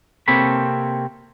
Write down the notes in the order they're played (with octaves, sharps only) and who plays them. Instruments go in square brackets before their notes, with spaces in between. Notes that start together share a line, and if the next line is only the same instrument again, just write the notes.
[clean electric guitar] C3 A#3 C4 A4 C#5 B5